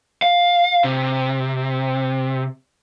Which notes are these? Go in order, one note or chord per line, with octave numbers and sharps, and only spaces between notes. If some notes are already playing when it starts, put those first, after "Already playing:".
F5
C3